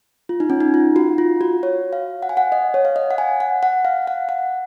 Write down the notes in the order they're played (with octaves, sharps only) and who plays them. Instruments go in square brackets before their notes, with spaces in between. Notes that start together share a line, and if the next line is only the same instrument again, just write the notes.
[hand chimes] F4
D#4
C#4
D#4
F4
F#4
F4
F#4
C#5
F5
F#5
G#5
F#5
D#5
C#5
F5
D#5
F#5
G#5
F#5
F#5
F5
F#5
F#5